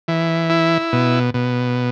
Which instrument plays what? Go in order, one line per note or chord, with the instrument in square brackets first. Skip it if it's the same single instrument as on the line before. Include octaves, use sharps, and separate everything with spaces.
[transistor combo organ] E3
E4
B2
B2